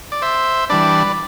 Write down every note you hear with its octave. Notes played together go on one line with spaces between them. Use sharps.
D5
C5 E5
E3 G3 D4 B4 D5